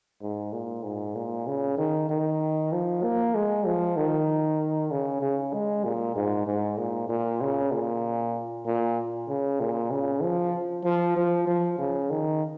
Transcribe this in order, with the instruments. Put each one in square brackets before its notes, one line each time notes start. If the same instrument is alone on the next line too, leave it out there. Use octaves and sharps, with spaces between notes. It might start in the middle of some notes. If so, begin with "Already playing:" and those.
[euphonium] G#2
A#2
G#2
A#2
C#3
D#3
D#3
F3
A#3
G#3
F3
D#3
C#3
C#3
G#3
A#2
G#2
G#2
A#2
A#2
C#3
A#2
A#2
C#3
A#2
C#3
F3
F3
F3
F3
C#3
D#3